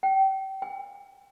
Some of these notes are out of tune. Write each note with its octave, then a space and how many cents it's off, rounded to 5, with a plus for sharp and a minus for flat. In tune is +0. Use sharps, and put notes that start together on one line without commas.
G5 -30
G5 +45